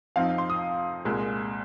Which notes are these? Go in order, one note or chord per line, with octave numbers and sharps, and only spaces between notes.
F2 F3 C4 D#4 F5
C6
D#6
C2 A#2 G#3